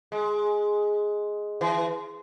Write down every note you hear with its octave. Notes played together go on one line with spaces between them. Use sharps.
G#3
E3